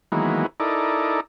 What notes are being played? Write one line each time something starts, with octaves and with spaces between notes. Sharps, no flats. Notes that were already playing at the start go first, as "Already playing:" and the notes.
D#3 E3 F#3 G#3 A#3 B3
D#4 E4 A4 A#4 D5